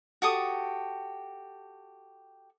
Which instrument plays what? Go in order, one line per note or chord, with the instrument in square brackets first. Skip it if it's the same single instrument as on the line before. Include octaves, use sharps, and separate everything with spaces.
[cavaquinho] F#4 G4 A4 D#6